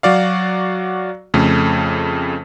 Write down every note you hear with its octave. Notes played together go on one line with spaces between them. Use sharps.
F#3 F#4 D5 F5
F2 C#3 A3